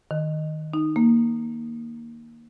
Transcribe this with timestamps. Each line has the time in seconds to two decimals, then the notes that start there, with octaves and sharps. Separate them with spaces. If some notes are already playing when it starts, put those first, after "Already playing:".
0.11 D#3
0.74 D#4
0.96 A#3